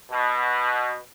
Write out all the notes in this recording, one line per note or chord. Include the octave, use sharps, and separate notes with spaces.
B2